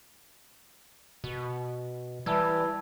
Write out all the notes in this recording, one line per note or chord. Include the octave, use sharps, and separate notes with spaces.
B2
E3 G3 A5 E6 G#6